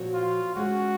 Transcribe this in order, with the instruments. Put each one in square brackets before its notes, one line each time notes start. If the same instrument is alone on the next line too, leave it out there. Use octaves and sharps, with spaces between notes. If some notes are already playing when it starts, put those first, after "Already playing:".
Already playing: [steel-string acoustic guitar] A#2 F3 C4 F#4 C#5
[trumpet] F4
[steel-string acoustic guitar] G#3 C#4 G#4 [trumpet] F#4